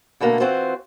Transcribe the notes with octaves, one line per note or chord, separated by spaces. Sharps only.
B2 D3 A3 A#3
E3 C4 F4 F#4 C5